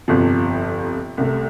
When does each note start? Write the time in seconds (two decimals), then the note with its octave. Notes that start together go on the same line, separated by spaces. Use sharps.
0.08 G1 F2 C3 F3
1.17 C2 C3 A3